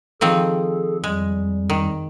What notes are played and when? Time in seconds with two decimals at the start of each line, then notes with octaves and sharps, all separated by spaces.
0.21 D#3 F3 C4 G#4 A4
1.04 F2 G3 G#3
1.70 D#3